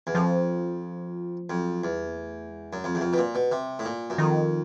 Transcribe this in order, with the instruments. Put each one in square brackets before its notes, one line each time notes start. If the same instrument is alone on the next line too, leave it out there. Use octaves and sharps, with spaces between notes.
[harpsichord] E2
[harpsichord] F2 [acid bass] F3
[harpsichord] F2 [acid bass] F#3
[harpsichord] E2 [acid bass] G3
[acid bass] A#3
A3
G#3
[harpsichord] F#2
F2
E2
F2
B2
A#2
B2
[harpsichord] C3 [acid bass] G3
[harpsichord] A2
A#2
F#2
[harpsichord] F2 [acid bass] D#3